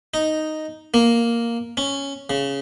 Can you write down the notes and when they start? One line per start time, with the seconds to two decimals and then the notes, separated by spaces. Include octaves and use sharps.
0.14 D#4
0.94 A#3
1.77 C#4
2.30 C#3